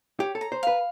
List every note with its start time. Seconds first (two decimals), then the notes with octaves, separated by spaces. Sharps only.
0.20 G4 C#5
0.35 A4
0.41 A#5
0.52 C5
0.63 B4 F5